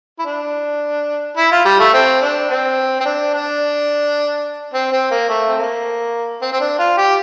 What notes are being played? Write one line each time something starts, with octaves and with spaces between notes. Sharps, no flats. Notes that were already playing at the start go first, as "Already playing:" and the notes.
E4
D4
E4
F4
G3
A3
C4
D4
C4
C4
D4
D4
C4
C4
A#3
A3
C4
A#3
C4
C4
D4
F4
G4